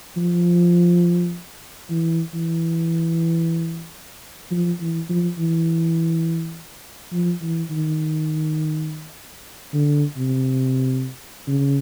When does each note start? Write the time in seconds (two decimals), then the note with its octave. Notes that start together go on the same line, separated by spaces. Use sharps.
0.17 F3
1.90 E3
2.34 E3
4.51 F3
4.80 E3
5.09 F3
5.38 E3
7.12 F3
7.42 E3
7.70 D#3
9.73 D3
10.17 C3
11.48 C#3